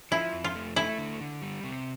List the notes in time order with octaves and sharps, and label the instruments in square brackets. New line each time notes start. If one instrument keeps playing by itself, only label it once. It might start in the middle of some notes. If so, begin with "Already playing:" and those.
[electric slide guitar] F3 [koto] E4
[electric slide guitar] F2
[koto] F4
[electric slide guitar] A3
[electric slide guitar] A3 [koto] E4
[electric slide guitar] D3
D3
G3
C3